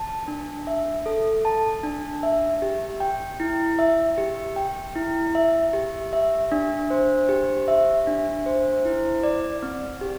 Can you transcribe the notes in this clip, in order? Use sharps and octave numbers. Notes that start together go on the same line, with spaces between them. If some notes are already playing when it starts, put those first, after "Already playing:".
Already playing: A5
D4
E5
A4
A5
D4
E5
G4
G5
E4
E5
G4
G5
E4
E5
G4
E5
D4
C5
G4
E5
D4
C5
E4
D5
C4
G4